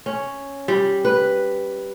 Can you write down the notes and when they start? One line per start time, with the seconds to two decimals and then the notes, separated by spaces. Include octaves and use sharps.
0.06 C#4
0.68 G3
1.05 B4